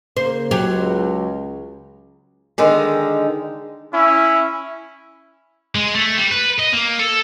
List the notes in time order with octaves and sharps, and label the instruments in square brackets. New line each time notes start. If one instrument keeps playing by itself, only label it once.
[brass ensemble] C#3 A#3 [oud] C5
[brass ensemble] C#2 [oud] F#3 G4
[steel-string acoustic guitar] D3 D#3 G#3
[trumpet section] C#4 E4
[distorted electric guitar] G#3
A3
G3
B4
D#5
A#3
A4